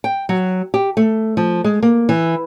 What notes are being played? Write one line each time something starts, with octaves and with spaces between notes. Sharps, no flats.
G5
F#3
G4
A3
F3
G#3
A#3
E3